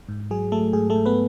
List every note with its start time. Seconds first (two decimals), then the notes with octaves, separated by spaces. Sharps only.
0.09 G#2
0.31 F#3 G#4
0.52 F#3 A3 A4
0.73 G#2 G#4
0.90 A3 A4
0.96 G#2
1.06 B3 B4